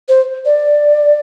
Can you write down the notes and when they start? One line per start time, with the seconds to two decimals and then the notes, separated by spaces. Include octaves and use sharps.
0.08 C5
0.45 D5